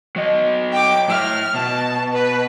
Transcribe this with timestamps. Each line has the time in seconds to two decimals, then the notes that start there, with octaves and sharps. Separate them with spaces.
0.16 F#3 D#5
0.72 G5 D6
1.09 A2 E5 F6
1.55 B2 A5
2.14 B4